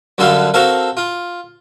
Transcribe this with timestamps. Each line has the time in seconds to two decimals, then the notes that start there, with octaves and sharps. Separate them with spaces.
0.18 F#2 D3 G3 F#4 A4 F5
0.54 C4 F#4 A4 A#4 F5
0.97 F4